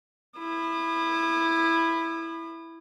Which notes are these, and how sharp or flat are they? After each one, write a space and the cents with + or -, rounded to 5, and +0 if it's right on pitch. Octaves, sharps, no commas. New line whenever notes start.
E4 +0 D#6 -45